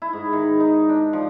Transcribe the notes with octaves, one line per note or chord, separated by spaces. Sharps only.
E4
G#2
D#3
D#4
D4
F3